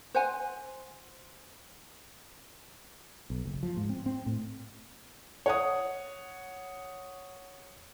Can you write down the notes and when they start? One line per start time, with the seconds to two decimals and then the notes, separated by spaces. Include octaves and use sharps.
0.14 C5 F#5 G#5
3.30 B1
3.45 F#1
3.63 F3
3.77 G#2
3.89 C4
4.06 C4
4.26 A2
5.46 C#5 F#5 D#6